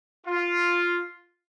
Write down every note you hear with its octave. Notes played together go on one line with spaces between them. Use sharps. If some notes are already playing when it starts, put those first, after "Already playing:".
F4